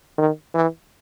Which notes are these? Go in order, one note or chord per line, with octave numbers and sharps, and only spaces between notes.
D#3
E3